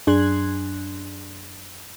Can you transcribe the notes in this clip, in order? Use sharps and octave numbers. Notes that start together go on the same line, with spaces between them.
F#2 D4 G#4 C6 F#6 G#6